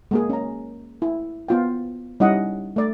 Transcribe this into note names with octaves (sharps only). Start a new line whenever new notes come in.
G#3 A#3 G#4
C#4 A#5
E4
B3 F4 G5
G3 C#4 D#4 E4 D#5 F#5
A3 D5